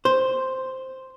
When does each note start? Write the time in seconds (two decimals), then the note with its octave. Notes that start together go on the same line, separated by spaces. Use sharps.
0.05 C5